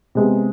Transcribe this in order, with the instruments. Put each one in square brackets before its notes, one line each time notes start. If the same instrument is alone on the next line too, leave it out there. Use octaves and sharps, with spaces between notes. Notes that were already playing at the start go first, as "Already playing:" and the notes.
[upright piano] C3 G#3 B3